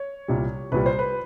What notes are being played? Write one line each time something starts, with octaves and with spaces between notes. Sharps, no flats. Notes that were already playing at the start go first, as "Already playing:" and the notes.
Already playing: C#5
C2 A#2 G3
C2 A#2 G3 B4
C5
B4